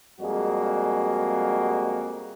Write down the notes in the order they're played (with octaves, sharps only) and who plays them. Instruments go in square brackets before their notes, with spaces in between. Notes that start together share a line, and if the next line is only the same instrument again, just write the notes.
[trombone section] F2 G3 G#3 A#3 F#4 G#4